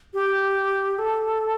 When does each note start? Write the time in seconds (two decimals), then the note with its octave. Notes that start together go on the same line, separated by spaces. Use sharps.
0.14 G4
0.99 A4